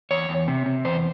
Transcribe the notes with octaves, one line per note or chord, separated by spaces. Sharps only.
E2 C#5
E2
C3
C3
E2 C5